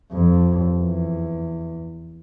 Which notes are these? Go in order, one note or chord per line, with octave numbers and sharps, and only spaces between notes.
F2
E2